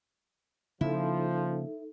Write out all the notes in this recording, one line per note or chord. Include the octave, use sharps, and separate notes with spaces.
C#3 F3 A#3 D#4 E4 A4